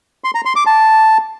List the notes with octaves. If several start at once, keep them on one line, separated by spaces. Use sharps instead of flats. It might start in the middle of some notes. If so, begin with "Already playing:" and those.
C6
A#5
C6
D6
A5